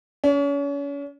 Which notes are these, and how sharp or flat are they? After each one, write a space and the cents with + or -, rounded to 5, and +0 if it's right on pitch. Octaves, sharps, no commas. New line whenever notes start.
C#4 +35